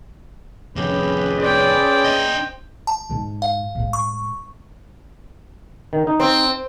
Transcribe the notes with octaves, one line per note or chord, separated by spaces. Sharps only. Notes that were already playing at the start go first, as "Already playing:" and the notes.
C2 F2 C#4 G4 G#4 B4
C5 D5 G5
D4 D#5
A5
G#2 G#3
F5
A2 G#3
C#6
D#3
D#4
C4